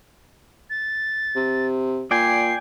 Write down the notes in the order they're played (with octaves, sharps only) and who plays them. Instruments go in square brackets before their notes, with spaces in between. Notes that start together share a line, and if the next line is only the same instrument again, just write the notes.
[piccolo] A6
[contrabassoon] C3
[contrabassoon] A#2 [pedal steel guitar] D5 G5 G#5 [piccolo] C7